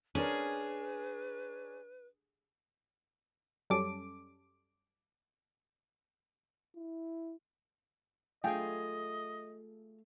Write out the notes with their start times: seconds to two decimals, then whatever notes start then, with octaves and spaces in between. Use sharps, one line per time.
0.15 C#4 D4 G#4 A#4 B4
3.70 F#2 G3 C#4 A4 D6 D7
6.76 E4
8.44 A3 F4 G#4 D#5 G5 G#5